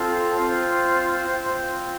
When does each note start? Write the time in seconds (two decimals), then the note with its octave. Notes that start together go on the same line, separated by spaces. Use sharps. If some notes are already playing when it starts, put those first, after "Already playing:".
Already playing: C4 F4 A4
0.38 C4 C5
1.27 C4 F4